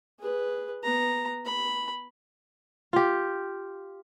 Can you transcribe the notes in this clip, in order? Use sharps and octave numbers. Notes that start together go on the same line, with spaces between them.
G#4 B4
B3 A#5
B5
F4 G4